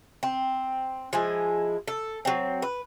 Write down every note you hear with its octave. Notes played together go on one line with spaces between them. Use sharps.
C4
F3 G#3 E4
A4
F#3 C4
B4